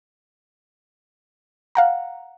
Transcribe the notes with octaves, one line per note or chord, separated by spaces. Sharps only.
F5 F#5 A#5